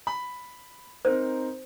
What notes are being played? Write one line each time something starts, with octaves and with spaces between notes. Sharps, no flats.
B5
C4 D#4 A#4 C5